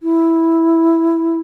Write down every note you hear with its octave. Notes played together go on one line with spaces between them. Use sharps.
E4